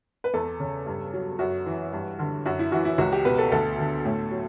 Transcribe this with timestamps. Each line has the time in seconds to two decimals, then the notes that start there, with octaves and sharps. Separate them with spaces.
0.24 B4
0.34 E2 A4
0.60 C#3
0.86 G2
1.14 F#3
1.39 F#2 F#4
1.66 E3
1.93 G2
2.19 D3
2.46 F#2 F#4
2.59 E4
2.72 E3 F#4
2.85 E4
2.98 C#2 F#4
3.12 G4
3.25 B2 B4
3.38 A4
3.52 D2 A4
3.79 D3
4.05 A2
4.31 F#3